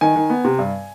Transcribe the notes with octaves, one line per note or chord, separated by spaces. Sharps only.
D#3 G#5
D#3
B3
C3
G2